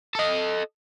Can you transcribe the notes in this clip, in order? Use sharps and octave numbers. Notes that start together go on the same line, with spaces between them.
A4 D#5